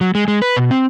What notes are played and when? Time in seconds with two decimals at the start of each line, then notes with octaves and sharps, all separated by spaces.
0.01 F#3
0.15 G#3
0.28 G#3
0.42 B4
0.57 B2
0.71 C4